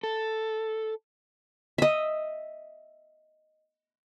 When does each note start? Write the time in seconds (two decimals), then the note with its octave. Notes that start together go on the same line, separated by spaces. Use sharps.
0.03 A4
1.78 D#5 E5